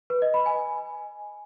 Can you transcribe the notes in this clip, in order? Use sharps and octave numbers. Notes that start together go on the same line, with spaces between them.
B4
D#5
B5
G#5